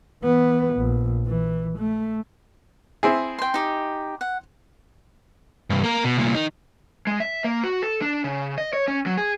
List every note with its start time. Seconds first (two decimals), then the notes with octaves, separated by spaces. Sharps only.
0.23 E3 B3
0.75 A#1
1.27 E3
1.78 A3
3.03 C4 E4 G#4
3.39 G5 C6
3.54 D#4 G4
4.21 F#5
5.70 C2 G2
5.84 A#3 A#4
6.04 B2
6.17 C2 A#2
6.35 D#3 D#4
7.07 G#3
7.20 E5
7.44 A#3
7.64 F#4
7.82 A4
8.02 D4
8.24 C#3
8.58 D#5
8.73 C#5
8.88 C#4
9.06 F#3
9.17 G#4